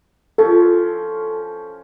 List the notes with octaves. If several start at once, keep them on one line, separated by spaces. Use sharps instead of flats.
F3 C#4 A4